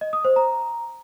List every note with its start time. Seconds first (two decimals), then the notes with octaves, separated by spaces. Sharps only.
0.01 D#5
0.13 D#6
0.25 C5
0.36 A#5